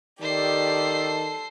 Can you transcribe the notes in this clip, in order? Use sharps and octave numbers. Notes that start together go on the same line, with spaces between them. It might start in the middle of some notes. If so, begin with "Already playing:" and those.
D#3 G4 A4 C5 D5 C7